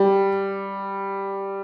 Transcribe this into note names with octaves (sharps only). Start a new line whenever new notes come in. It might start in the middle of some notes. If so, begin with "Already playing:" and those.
Already playing: G3